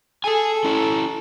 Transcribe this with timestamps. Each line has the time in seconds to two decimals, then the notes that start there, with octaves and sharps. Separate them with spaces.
0.24 G#4 A4 G#5
0.64 C#4 E4